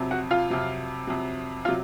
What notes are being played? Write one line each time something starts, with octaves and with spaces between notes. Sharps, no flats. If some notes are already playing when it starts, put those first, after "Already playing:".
Already playing: F2 C3 F#3
F#4 F#5
F4 F5
F2 C3 F#3
F2 C3 F#3
C3 F#3 F4 F5